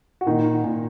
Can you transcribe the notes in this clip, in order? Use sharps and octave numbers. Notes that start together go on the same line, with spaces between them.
F#4
A#2 D#3 D#4
A#2